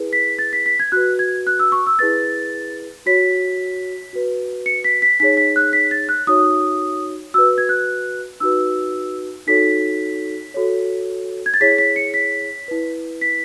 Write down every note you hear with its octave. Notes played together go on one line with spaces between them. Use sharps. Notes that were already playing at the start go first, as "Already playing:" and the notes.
Already playing: E4 G#4 B4
B6
A6
B6
B6
G#6
F#4 B4 F#6
G#6
F#6
E6
C#6
E6
E4 G#4 B4 A6
F#4 C#5 B6
F#4 B4
C#7
B6
B6
D#4 G#4 C#5 B6
B6
F#6
B6
A6
F#6
D#4 F#4 C#5 D#6
F#4 B4 E6
G#6
F#6
D#4 F#4 B4 E6
D#4 F#4 A4 C#5 B6
F#4 A4 C#5
G#6
A6
E4 G#4 C#5 B6
B6
C#7
B6
E4 B4
B6